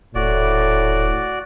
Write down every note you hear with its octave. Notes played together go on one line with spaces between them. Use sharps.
D#1 A2 F#4 D5